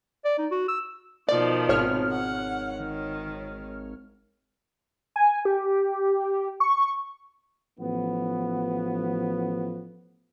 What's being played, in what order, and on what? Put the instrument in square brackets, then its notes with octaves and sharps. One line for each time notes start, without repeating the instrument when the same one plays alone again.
[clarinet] D5
D#4
F#4
E6
[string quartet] B2 D#3 F3 [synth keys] D5
[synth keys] G#1 C#5 F6
[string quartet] F#5
D#3
[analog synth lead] G#5
G4
C#6
[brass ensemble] A1 F3 B3